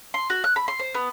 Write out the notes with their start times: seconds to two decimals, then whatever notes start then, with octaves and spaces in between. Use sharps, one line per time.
0.14 C6
0.30 F#4
0.44 F#6
0.56 B5
0.68 C6
0.79 C5
0.94 B3